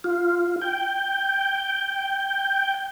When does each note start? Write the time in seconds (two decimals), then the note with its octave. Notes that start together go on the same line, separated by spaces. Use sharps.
0.04 F4
0.61 G5